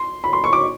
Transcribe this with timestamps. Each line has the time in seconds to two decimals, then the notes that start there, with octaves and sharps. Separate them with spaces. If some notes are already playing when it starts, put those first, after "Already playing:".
Already playing: C6
0.24 B5
0.33 C6
0.44 C#6
0.53 D6